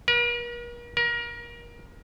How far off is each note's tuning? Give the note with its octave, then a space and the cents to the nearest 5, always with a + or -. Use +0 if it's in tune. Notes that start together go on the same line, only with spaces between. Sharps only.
A#4 +45
A#4 +30